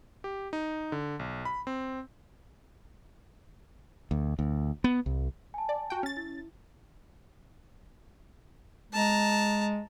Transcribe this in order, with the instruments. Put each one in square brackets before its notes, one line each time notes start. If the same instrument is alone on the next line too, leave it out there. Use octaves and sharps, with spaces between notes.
[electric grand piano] G4
D#4
D3
B1
B5
C4
[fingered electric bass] D2
D2
B3
C2
[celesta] G#5 A5
[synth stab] D5
F#4 G5
C#4 A6
[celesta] E4
[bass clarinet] G#3 [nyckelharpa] A5 A#5